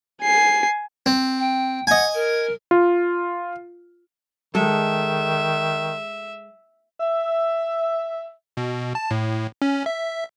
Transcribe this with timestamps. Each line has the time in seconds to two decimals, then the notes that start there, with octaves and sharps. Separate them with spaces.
0.22 G#5 C7
1.06 C4
1.38 G5
1.87 D#5 F#5 G#5
2.14 A#4
2.71 F4
4.55 D#3 G#3 A4 E5
7.00 E5
8.57 B2
8.95 A5
9.11 A2
9.62 C#4
9.86 E5